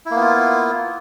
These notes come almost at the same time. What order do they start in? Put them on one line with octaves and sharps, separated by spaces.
E4 A#3 B3 F4